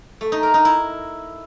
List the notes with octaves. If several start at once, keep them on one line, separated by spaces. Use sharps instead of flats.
A3
D#4
A#4
D#4
E4